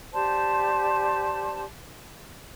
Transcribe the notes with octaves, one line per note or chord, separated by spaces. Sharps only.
G4 C5 D5 A5